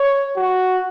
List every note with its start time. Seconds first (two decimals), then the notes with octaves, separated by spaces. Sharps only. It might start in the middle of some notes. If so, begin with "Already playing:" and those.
Already playing: C#5
0.37 F#4